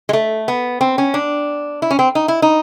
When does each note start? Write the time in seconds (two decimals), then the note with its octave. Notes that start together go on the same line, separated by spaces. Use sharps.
0.09 G#3
0.13 A3
0.48 B3
0.81 C4
0.98 C#4
1.14 D4
1.82 E4
1.91 C#4
1.99 C4
2.15 D#4
2.28 E4
2.42 D#4